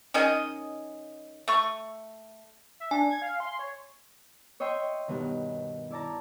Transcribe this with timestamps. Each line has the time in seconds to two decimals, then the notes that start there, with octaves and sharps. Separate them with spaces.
0.14 D#3 C#4 G#4 D#5
1.48 A3 C#6
2.80 E5
2.91 D4 G#5
3.10 G#6
3.22 F5
3.40 C6
3.59 C#5
4.60 C#5 D#5 E5 G5 C6 C#6
5.08 G2 B2 D#3
5.91 E4 D5 A5 A#5